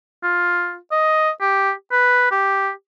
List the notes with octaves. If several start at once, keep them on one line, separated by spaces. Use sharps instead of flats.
F4
D#5
G4
B4
G4